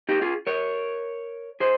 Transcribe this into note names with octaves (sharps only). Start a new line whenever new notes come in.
D#4 G4
F4 G#4
A#4 C#5
G#4 C5